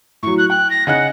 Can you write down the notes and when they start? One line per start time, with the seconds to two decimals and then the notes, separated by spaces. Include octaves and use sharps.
0.23 A2 F#3 C#6
0.38 F#6
0.50 G5 F#6
0.70 A#6
0.87 C#3 D#4 F#5 F#6